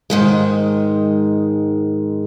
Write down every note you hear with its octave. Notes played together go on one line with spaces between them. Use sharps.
G#2 D#3 G#3